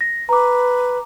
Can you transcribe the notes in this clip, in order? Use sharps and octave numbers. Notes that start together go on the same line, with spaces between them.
A#6
B4 A#5 D6